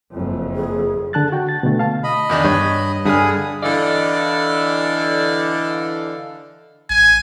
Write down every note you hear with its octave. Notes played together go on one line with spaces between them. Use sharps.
F#1 F2
G#4
D3 A5 F#6 A6
F#4 G5
A6
B2 D3 A3
F5 A5
D#5 B5
E2 D#3 D4
G2 C#5
G2 D3 G#4 G#5 B5 D#6 F6
D3 E3 A4 D5 D#5 F5
A1 G#5